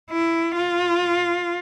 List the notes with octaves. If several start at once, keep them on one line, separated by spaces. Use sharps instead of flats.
E4
F4